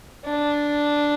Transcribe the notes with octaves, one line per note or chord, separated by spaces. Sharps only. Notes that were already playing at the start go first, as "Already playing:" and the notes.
D4